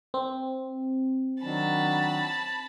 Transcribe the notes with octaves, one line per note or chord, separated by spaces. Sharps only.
C4
D#3 F#3 D4 A5 B5